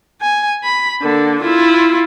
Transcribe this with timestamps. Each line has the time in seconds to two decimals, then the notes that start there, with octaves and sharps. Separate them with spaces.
0.22 G#5
0.64 B5
1.02 D3 A#3
1.42 E4 F4